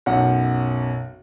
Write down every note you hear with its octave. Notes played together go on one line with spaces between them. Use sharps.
B1 F#2 F#5